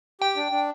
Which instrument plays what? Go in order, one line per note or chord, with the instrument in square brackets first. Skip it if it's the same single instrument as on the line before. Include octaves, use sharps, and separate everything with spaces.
[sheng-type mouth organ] G4 [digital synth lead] G5
[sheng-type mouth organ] D4
D4